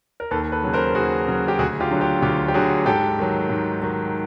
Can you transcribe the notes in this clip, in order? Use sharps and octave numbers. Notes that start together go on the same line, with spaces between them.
A#4
D#2 A4 B4
A4 B4
C#3 F#3
A#4 C5
D#2 F#4 G#4
C#3 F#3
G4
D2 F#4 G#4
F4 G4
D3 F#3
F4 G4
D2 F4 G4
G4
D3 F#3 F#4 G#4
G#2 G4 A4
D#3 F#3
G#2
D#3 F#3